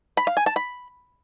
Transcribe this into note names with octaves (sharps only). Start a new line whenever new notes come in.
B5
F5
G#5
A5
B5